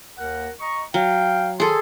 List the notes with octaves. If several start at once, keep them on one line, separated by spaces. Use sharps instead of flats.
D#2 A#4 F#5
D#5 A#5 C#6
F#3 F5 G5
D#3 G#4 A4 C6